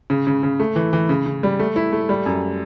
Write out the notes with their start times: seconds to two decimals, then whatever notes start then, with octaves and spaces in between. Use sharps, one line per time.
0.10 C#3
0.27 C#3
0.43 C#3
0.59 A3
0.76 E3
0.93 E3
1.09 C#3
1.26 C#3
1.43 G3
1.59 A3
1.76 E4
1.92 A3
2.09 G3
2.26 F#2